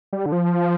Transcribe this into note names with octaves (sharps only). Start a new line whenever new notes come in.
G3
D3
F3